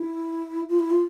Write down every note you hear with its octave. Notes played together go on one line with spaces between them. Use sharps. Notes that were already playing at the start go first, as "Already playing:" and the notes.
Already playing: E4
F4
E4
F4